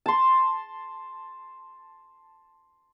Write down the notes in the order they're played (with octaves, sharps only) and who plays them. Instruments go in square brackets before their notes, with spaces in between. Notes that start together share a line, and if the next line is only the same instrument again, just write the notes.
[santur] A5 C6